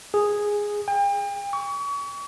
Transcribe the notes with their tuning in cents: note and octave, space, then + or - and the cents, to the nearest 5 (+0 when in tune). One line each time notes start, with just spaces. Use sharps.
G#4 -5
G5 +40
C#6 +35